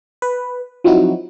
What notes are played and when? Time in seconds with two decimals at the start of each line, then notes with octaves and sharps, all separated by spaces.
0.22 B4
0.84 F3 F#3 C4 D#4 E4 F#4